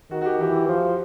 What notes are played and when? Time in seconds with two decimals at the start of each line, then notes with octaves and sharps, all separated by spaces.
0.11 D#3 F#4
0.21 F#4
0.26 G4
0.40 E3 G4
0.68 F3